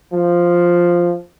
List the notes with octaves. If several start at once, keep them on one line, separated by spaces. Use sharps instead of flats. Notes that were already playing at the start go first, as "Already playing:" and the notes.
F3